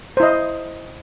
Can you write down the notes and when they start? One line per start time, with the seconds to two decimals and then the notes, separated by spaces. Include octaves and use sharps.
0.17 C5
0.20 E4
0.23 D#5